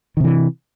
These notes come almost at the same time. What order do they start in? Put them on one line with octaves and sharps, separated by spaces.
D#3 C3 E3